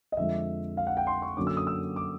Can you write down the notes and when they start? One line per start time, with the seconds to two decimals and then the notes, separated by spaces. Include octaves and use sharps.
0.12 D#5
0.17 F2 D3 F3 G#3 E5
0.77 F5
0.87 F#5
0.97 G5
1.07 C6
1.22 C#6
1.37 F#2 D3 F#3 A#3 C#4 D6
1.47 E6
1.57 D#6
1.67 E6
1.96 D6